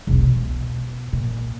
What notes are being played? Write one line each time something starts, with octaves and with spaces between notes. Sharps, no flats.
E1 B1
B2
A#2